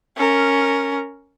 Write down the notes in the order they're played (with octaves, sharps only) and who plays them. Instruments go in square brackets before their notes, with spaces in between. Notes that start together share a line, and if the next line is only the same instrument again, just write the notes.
[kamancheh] C#4 A#4